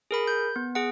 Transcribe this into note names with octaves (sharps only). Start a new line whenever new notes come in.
G#4 A#4 B5
G6
B3
G#4 F#5